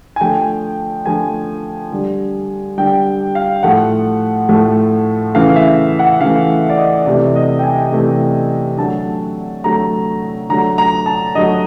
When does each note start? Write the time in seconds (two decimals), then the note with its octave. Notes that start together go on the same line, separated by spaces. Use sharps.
0.16 G#5
0.21 D3 F3 A3 G5
1.06 D3 F3 A3 G#5
1.92 D3 G3
2.78 D3 G3 G5
3.35 F5
3.63 A2 F3 A3 F#5
4.49 A2 F3 A3
5.34 C#3 E3 A3 F5
5.56 E5
5.99 F#5
6.21 C#3 E3 A3 F5
6.70 D5
6.78 D#5
7.06 C3 E3 A3 D5
7.36 D#5
7.59 G5
7.63 G#5
7.92 C3 E3 A3
8.77 D3 F#3 A3 A5
9.64 D3 F#3 A3 A#5
10.50 D3 F#3 A3 A#5
10.78 A#5
11.06 A5
11.35 D3 F#3 A3 D#5